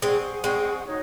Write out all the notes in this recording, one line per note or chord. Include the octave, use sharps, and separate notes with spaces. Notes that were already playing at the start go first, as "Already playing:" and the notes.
G#3 C4 G#4 C5 F#5 C#6
G#3 C4
D#4 F#4 C#5